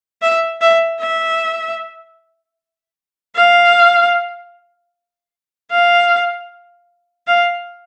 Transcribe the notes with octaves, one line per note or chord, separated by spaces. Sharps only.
E5
E5
E5
F5
F5
F5